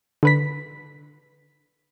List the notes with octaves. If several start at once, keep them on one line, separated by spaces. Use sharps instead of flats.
D3 B4 B6